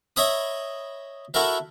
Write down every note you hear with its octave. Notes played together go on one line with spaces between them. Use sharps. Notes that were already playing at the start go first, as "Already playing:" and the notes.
C#5 D#5 E5 B5 D#6
E4 F#4 A4 A#4 E5